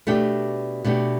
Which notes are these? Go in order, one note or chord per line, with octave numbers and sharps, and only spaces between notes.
B2 A3 D4 G4
B2 A3 D4 G4